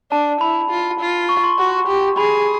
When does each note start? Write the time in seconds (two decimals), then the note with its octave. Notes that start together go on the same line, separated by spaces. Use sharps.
0.12 D4 A5
0.41 E4 B5
0.71 F4
1.00 F4
1.29 C#6
1.44 C6
1.58 F#4
1.88 G4
2.17 G#4 B5